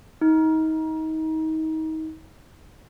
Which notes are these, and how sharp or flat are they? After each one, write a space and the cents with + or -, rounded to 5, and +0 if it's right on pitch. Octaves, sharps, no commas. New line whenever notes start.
D#4 +30